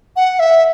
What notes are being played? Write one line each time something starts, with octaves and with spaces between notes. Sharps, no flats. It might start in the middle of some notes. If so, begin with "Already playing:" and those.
F#5
E5